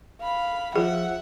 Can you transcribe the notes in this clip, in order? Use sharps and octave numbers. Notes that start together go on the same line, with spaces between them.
F5 B5
F3 G#4 E5 F#5